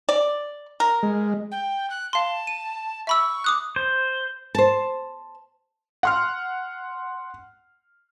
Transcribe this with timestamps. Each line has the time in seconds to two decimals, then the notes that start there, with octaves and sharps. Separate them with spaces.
0.09 D5
0.80 A#4
1.03 G#3
1.51 G5
1.90 F#6
2.13 F5 A5 C6
2.47 D#7
3.07 E5 B5 C#6 E6
3.44 D6 D#6 F#6
3.76 C5
4.55 C5 A5
6.03 F#5 C6 F6